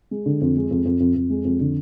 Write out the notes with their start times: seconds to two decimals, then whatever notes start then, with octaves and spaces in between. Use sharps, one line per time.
0.11 G#3
0.26 D3
0.41 F2
0.57 G#3
0.71 F2
0.85 F2
1.00 F2
1.15 F2
1.30 G#3
1.45 F2
1.60 D3